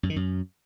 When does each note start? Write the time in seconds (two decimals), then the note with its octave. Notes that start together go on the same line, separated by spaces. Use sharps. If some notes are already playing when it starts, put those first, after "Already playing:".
0.03 F#2
0.10 D#3
0.16 F#2